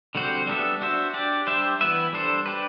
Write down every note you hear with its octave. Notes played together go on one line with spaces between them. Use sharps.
D3 G3 C4 F#4 C5
G3 B3 D4 A4 E5
D4 F#4 C5 E5
D4 G4 D5
G3 D4 G4 C5 E5
E3 B3 E4 B4 E5
G3 D4 A4 C5
D4 G4 B4